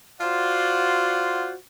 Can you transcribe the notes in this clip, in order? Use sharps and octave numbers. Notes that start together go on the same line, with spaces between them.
F4 F#4 C5 D5 F#5